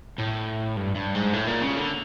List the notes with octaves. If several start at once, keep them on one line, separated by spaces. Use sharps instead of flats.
A2
G2
G2
G#2
A2
A#2
C#3
D3